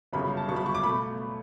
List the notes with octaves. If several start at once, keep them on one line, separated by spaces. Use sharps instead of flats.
G1 F#2 C#3 F#3 B5
A5
G1 F#2 C#3 F#3 C#6
B5
C#6
D6
B2 A3 B5